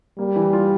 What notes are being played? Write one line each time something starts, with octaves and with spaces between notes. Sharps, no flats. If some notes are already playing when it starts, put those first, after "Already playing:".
G3 A#3
E3
F4